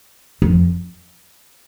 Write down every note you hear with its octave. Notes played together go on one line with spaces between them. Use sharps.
F2